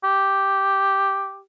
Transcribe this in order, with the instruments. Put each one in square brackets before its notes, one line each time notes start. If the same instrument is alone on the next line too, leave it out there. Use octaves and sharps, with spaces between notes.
[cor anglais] G4